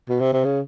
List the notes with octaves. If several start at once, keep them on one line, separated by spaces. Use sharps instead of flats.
B2
C3
C3
C#3